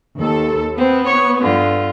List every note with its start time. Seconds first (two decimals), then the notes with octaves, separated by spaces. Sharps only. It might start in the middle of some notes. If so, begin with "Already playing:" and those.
0.18 D#2 A4
0.77 B3 C4
1.06 C#5 C#6
1.41 G2 D3 F4